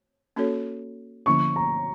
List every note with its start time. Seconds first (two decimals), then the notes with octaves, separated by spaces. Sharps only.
0.36 A#3 C#4 F#4 A4 C#5
1.26 D3 F3 A#3 C#4 E4 C#6
1.56 A#5